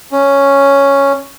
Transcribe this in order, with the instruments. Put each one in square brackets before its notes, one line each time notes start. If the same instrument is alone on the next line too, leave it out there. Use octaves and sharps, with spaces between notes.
[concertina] C#4